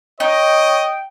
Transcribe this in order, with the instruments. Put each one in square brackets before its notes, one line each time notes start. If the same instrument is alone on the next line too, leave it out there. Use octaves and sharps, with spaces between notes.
[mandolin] D#4 [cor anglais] C#5 [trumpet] D#5 [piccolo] G5